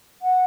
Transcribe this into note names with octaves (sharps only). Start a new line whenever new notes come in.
F#5